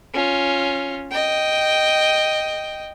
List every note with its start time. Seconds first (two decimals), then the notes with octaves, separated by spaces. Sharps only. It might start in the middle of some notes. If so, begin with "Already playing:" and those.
0.14 C#4 F4
1.12 D#5 G5